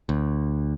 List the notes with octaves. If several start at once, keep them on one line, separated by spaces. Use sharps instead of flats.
D2